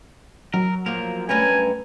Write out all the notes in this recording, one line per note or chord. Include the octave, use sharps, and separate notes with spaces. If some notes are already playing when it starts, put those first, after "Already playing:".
F#3 A#4
F3 A#3 A#4
G2 A3 C#4 A#4 B4 G#5